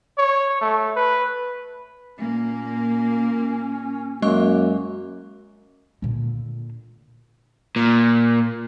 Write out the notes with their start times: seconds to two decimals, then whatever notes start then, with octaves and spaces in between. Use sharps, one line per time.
0.18 C#5
0.61 A3
0.96 B4
2.19 A#2 A#3 C#4
4.22 F#2 G#3 A#3 D#5 C#6
6.02 A#2 D3
7.76 A#2